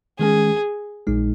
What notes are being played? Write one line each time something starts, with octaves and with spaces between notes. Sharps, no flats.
D#3 G#3 C#4 G#4
A#1 A#2 G#3 D#4